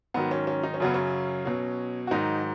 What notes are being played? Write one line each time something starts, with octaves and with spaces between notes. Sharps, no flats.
G#2 D#3 F#3 B3
C#4
C#4
D#4
C#4
F#2 C#3 F#3 B3
C#4
B2 F#3
F#4
G#2 D#3 F#3 D#4